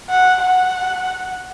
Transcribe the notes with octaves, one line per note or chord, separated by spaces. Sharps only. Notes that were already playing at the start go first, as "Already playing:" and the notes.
F#5
F#5